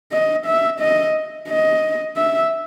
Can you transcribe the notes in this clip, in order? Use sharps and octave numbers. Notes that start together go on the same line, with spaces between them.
D#5
E5
D#5
D#5
E5